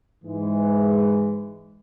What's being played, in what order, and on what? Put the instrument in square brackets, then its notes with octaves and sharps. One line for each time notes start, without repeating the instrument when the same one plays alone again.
[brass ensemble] G#2 E3 G#3